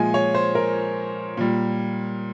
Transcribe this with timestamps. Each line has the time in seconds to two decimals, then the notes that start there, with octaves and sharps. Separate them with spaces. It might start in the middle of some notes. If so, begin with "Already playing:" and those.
Already playing: A#2 F3 G#3 G#5
0.14 C#5
0.34 C5
0.55 A#4
1.37 A#2 G3